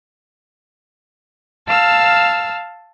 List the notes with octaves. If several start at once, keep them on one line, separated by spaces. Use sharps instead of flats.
F5 A5 E6 F6